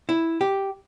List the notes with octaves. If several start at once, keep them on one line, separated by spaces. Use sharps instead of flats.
E4
G4